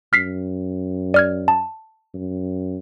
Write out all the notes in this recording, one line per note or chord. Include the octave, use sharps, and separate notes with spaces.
F#2 F6 B6 C7
D5 F6 G#6
A5
F#2